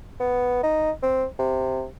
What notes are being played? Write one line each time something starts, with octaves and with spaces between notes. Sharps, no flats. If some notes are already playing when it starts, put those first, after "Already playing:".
B3
D#4
C4
C3